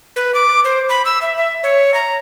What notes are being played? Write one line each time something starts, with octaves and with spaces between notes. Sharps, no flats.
B4
D6
C5
B5
E6
E5
E5
C#5
A#5